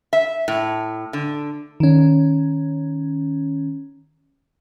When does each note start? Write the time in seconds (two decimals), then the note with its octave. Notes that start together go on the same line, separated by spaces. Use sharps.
0.13 E5
0.48 A2
1.13 D3
1.80 D#3 C#4